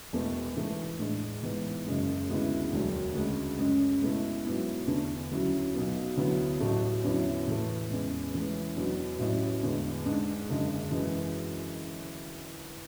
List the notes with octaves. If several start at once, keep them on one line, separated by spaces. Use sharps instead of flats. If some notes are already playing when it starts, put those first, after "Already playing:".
E1 E2 B2 A3
G#2 E3 A3
A2 G#3 D4
G#2 E3 B3
F#1 F#2 C#3 G#3
D2 C#3 G#3 B3 E4
E1 D2 D3 F#3
D2 C#3 G#3
F#2 C#3 G#3 C#4
C#2 B2 A3 E4
G#2 F#3 B3 E4
E2 D3 A3 D4
D2 C#3 F#3 C#4 E4
B1 B2 F#3 B3
D2 D3 F#3 B3 E4
A1 A2 F#3 A3
E2 D3 F#3 C#4 E4
A2 E3 A3
E2 C#3 G#3
C#2 C#3 E3 A3 C#4
E2 B2 F#3 B3 D4
A1 A2 F#3 C#4 E4
E2 D3 G#3
G#2 G#3 D4
F#1 F#2 D3 G#3
F#2 E3 G#3